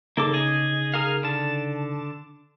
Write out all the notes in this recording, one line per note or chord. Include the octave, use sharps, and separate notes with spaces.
C#3 A#3 D#4 A4 D6
G#4 D#5
G#4 A#4 F5
D3 A5